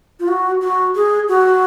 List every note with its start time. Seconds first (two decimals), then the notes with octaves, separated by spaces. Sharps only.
0.20 F4
0.28 F#4
0.61 F#4
0.95 G#4
1.29 F#4